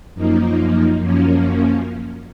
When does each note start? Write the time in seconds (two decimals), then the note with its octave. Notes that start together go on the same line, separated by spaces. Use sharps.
0.15 F#2 F3 A#3 D#4
1.00 F#2 F3 A#3 C#4